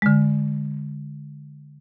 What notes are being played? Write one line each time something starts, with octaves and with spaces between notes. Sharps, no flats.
D3 G#3